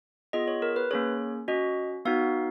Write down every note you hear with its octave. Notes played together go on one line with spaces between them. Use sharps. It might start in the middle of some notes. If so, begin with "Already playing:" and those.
B3 F4 G#4 D#5
C#5
A#4
B4
A#3 C#4 G#4 C#5
C#4 F#4 D#5
B3 D#4 F#4 F5